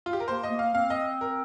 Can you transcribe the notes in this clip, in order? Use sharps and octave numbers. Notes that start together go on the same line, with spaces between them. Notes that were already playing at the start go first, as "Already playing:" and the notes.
F4
G4
A#4
A#3 C5
D#5
A#3
F5
C4 F5
D#5
A#4